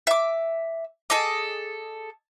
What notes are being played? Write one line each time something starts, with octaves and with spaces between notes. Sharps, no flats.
E5 D6
G#4 A4 D#5 D6